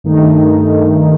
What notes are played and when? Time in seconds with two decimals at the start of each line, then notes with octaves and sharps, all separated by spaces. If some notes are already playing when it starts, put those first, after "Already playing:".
0.04 G2 D#3 A3 D#4